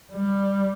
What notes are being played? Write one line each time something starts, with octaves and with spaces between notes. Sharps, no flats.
G3